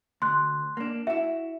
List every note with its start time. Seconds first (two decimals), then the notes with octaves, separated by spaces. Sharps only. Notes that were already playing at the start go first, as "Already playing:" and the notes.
0.22 D2 C6 F#6
0.77 A#3 D4
1.07 E4 F#4 E5